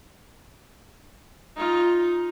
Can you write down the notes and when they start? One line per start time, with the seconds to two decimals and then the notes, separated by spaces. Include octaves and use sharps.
1.57 D#4 F4